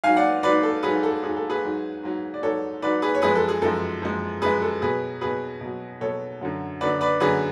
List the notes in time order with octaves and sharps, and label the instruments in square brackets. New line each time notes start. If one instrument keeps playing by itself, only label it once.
[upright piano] G#2 F#3 F5 G#5
D5 F#5
G#2 F#3 B4 D5
A4
G#2 F#3 G#4 B4
A4
G#2 F#3 G#4
A4
G#4 B4
G#2 F#3
G#2 F#3
D5
G#2 F#3 A4 C#5
G#2 F#3 B4 D5
G#4 B4
C#5
F#2 F3 G#3 G#4 B4
A4
G#4
F#2 F3 G#3 A4
F#2 F3 G#3
F#2 F3 G#3 G#4 B4
A4
B2 F#3 G#4 B4
B2 F#3 G#4 B4
B2 F#3
B2 F#3 A4 C#5
F#2 D3 F#3
F#2 D3 F#3 B4 D5
B4 D5
F#2 D3 F#3 G#4 B4